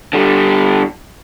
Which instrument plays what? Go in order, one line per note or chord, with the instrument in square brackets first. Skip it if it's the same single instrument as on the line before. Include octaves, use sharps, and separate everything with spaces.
[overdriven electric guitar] D3 G3